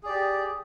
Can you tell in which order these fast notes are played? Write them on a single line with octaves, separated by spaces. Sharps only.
G#4 D5 G4